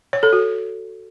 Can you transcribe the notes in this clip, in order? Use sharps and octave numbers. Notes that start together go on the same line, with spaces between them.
C#5
A4
F#4